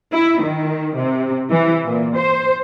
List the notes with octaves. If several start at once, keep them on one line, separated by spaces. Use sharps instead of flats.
E4
D#3
C3
E3
A#2
C5